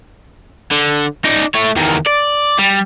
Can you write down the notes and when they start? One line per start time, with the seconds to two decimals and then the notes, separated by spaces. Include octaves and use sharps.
0.72 D3
1.25 D#4 D5
1.55 A3 C#5
1.76 E2 D#3
2.06 D5
2.58 G3